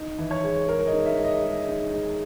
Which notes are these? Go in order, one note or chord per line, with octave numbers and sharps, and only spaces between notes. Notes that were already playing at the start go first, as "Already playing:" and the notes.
Already playing: D#4
E3
C#5
G#3
G#3 A#4
D#5
D#4
E5
G#3
D#5
G#3
D#4
G#3